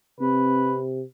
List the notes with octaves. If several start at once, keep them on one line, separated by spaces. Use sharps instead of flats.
C3 C4 B4